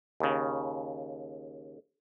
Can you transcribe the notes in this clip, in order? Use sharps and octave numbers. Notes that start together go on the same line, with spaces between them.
D#2 C#3